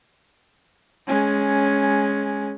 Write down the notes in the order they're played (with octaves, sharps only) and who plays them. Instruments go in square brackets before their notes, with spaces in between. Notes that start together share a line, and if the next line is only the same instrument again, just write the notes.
[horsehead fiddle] G#3 C#4